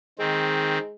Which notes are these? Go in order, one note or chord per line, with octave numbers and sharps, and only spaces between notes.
D#3 G#3 C4